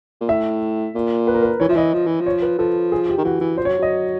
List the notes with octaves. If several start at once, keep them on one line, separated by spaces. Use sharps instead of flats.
A#2
A2 E5
A#2
B4
A#4
B4
E3 C#5
F3 E5
E3 D#5
F3
E3
F3
C#5
B4
F3 A4
G#4
G4
D#3
E3 F#4
E3
F3 C5
C#5
F#3
F#3 D#5